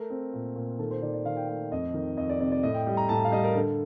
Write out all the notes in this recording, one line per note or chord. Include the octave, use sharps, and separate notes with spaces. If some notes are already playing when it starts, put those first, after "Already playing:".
Already playing: A3 A#4
C4
A#2
A#2
D#3 A4
C5
D#3 D5
D5
D#3 F5
G5
A3 G5
F2 D#5
D#3
F2 D#5
D5
C3 D5
D5
A2 D#5
G5
G3
A#5
A2 A5
F5
G3 D#5
A#4
D3 A4